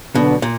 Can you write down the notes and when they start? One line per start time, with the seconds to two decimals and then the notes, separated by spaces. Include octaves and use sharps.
0.15 B2 D3 F#3 B3 D4
0.42 A#2